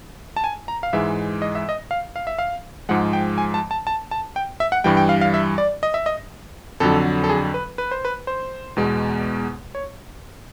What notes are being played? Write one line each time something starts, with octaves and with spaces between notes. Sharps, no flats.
A5
G#5
A#5
F5
G#2 E3 G#3 E5
D#5
E5
D#5
F5
F5
E5
F5
G#2 F3 G#3 F#5
G5
G#5
A5
A5
A5
A5
G5
E5
F#5
G2 E3 G3 G5
G5
F5
F5
E5
D5
D#5
E5
D#5
F2 D3 F#3 A4
A4
G#4
B4
B4
C5
B4
C5
E2 B2 G#3
C#5